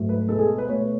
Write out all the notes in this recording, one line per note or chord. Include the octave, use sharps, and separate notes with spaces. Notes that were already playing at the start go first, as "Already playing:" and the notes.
Already playing: G#2 F#3 A3
B4
B2 G#3 A4
G#4
B4
B2 A3 C#5